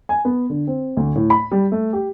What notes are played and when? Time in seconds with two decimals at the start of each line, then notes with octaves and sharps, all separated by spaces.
0.09 G#5
0.25 B3
0.50 D3
0.67 C4
0.97 D2
1.16 A2
1.30 B5
1.52 G3
1.72 A3
1.93 G4